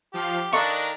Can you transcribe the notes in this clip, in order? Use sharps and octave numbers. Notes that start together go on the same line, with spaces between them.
F3 G4 F5
D#3 D4 A4 A#4 D#5 F5 C#6 F#6